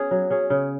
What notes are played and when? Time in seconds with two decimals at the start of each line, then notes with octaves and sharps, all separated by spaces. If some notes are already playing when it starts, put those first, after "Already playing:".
Already playing: B3 C#4 G#4
0.11 F#3
0.30 C#4 G#4
0.50 C#3